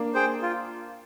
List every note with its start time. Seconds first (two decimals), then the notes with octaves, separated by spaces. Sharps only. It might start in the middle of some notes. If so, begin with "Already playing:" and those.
Already playing: A#3 D4
0.14 G#4 C5 G5
0.42 F4